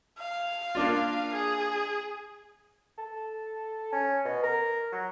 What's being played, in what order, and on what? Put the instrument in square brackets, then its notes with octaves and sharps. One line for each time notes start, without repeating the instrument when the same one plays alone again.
[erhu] F5
[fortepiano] A#3 D4 F4
[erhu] G#4
[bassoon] A4
C#4
B2
A#4
F#3